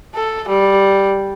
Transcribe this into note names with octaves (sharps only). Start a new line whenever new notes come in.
A4
G3